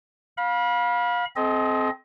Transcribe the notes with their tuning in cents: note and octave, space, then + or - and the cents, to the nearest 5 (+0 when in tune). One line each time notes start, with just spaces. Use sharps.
F5 +25 B5 -30
C4 +0 A4 -40 D#5 +15